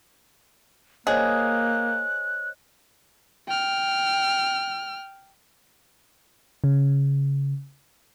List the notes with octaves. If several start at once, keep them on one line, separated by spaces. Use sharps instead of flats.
A#3 G#4 C5 C#5 D#5 F#6
G5 F6
C#3